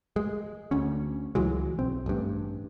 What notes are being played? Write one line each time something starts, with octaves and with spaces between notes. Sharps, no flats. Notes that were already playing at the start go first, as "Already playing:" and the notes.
G#3
D2 D3 C#4
C#2 E3 F#3 G#3
B1 C4
A1 G2